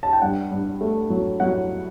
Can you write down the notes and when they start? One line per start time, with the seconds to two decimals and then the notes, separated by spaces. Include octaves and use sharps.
0.03 A5
0.13 G5
0.22 G2 F#5
0.51 G2
0.81 A3
1.10 F#3
1.40 F#3 F#5